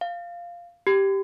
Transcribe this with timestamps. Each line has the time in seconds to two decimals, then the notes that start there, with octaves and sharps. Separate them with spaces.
0.01 F5
0.87 G4